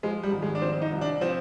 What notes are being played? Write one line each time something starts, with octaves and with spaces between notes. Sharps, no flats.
F3 G#3
G3
G#1
G#3
D4
F3 C4
D#4
C2
D4
F3 C4